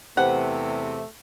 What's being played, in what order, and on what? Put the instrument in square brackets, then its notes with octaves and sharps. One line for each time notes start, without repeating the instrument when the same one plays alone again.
[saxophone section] E2 C3 [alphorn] A3 [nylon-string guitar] G4 B4 C5 [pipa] F#5